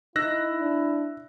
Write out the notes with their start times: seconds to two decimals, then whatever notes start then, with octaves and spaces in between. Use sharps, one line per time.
0.16 D#4 E4 E6 F#6 A#6
0.60 D4